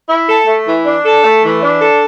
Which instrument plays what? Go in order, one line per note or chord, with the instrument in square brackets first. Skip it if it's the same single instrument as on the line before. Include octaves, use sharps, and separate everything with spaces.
[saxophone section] E4
A4
A3
E3
D4
A4
A3
E3
D4
A4